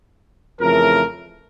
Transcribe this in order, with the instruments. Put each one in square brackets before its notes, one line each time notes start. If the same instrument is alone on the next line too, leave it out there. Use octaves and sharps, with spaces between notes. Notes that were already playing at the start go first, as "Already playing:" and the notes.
[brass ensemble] F2 C#3 E3 A3 A#4